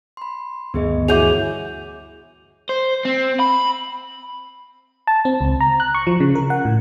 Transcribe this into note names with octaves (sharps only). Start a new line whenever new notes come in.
B5 C6
D2 G2 D#3 B3 G#4 D#5
E3 F#4 G#4 C#5 E5 D6 G6 F7
C5
C4
B5
A5
C4
C#2
A#5
F#6
C#6
F3
C#3
A#4
F#5
A2